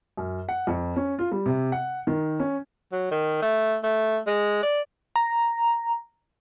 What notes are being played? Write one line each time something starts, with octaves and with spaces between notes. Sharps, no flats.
F#2
F#5
F2
C#4
F4
G3
C3
F#5
D#3
C#4
F#3
D#3
A3
A3
G#3
D5
A#5